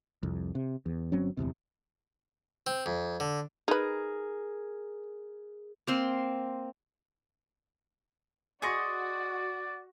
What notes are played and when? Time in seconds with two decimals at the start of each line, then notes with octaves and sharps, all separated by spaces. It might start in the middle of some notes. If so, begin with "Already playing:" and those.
0.23 C2 F2
0.55 C3
0.86 E2
1.12 G1 F#3 C4 C#4
1.37 D1 G1 E2 C3
2.67 C4
2.86 F2
3.20 D3
3.68 D#4 G#4 A#4 B4
5.87 A#3 C4 C6
8.62 F#4 G#4 D5 D#5 C6 C#6 A#6 C#7